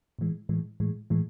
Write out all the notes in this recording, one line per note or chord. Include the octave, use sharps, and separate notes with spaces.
A2 E3 G#3
A2 E3 G#3
A2 E3 G#3
A2 E3 G#3